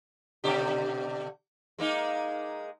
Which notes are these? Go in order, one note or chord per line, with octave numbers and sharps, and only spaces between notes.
B2 D3 G4
G#3 A#3 D#4